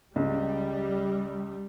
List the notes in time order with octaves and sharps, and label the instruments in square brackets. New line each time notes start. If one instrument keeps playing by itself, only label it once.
[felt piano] C#2 [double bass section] G3